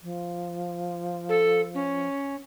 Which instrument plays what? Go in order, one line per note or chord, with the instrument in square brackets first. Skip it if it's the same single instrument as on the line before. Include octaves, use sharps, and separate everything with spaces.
[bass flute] F3
[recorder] A4
C#4